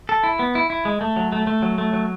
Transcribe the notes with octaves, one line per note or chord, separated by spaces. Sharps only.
A4
E4
B3
E4
E4
G#3
A3
F#3
A3
A3
F#3
A3
F#3